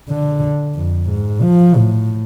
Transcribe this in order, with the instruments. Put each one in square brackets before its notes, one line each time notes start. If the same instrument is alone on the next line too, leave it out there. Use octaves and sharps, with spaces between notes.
[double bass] D3
F2
G#2
F3
A2